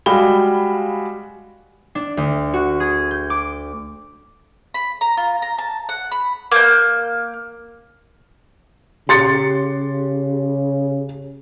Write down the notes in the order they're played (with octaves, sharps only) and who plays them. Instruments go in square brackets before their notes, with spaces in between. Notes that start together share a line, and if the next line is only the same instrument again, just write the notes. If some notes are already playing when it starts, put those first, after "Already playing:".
[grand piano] G3 G#3 F#4 F5 B5 G7
[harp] D4
D2
F#4
G#4
G6
D6
[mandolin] B5
A#5
F4
A#5
A5
F#5
B5
A#3 G6
[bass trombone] C#3 [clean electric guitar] G4 [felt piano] C6 A6 C#7